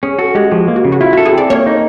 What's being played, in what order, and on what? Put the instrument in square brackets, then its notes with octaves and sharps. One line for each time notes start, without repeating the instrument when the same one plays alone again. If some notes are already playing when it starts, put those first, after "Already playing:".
[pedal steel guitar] C#4 [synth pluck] G#4
[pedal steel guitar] F#4 [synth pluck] A4
[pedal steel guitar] G#3 [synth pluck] G4
[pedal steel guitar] F3 [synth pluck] G4
[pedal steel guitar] A#3
[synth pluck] F#4
[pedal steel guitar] C#3
[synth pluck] F#4
[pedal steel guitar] E4 [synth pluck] F4
[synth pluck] F#4 [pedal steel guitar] A4
[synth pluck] G#4
[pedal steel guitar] C4 [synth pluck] D5
[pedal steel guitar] A#3 [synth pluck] C#5
[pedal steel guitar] D#4